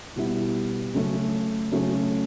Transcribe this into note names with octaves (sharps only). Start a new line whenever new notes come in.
B2 G3 B3 E4
C#3 F#3 A3 C#4
C#3 F#3 A3 C#4